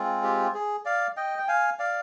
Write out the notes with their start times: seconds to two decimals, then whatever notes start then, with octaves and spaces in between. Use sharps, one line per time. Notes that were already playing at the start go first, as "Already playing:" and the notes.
Already playing: G#3 C4 F4
0.23 G4
0.55 G#4
0.85 D5 F5
1.17 D#5 G5
1.38 G5
1.48 F5 G#5
1.79 D5 F5